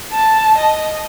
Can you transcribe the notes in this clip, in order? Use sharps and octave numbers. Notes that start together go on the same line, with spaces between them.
A5
D#5